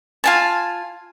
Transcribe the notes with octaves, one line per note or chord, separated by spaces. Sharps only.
F4 G#5 A5